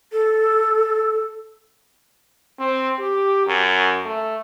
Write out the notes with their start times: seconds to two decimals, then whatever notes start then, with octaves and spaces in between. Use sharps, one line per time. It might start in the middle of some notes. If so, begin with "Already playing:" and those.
0.13 A4
2.59 C4
2.99 G4
3.47 F#2
4.05 A3